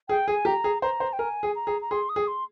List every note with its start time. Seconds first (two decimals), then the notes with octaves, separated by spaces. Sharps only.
0.09 G#4 G5
0.27 G#4 G#5
0.45 G4 A#5
0.64 G#4
0.82 C5 A#5
1.00 C5
1.13 G5
1.19 A#4 G#5
1.43 G#4
1.56 A#5
1.67 G#4
1.82 A#5
1.91 G#4 C6
2.09 D#6
2.16 G#4
2.28 C6